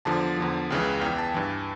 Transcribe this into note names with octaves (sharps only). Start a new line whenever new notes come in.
E2 D3 F3 A5
E2 D3 F3
C#2 C#3 E3
E2 E3 G5
A5
G2 E3